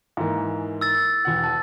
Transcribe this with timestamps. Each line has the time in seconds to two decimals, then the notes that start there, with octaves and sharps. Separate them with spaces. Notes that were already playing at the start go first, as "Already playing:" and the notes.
0.17 G#2 E3 A#3
0.81 E6 A6
1.25 E1 F#5
1.44 A5